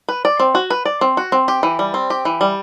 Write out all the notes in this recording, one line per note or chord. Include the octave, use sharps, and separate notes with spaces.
B4
D5
C4
F#4
B4
D5
C4
F#4
C4
G4
E3
G3
C4
G4
E3
G3